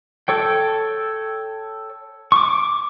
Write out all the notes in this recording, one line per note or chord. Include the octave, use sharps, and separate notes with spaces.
A4 C#5 G5
C#6 D6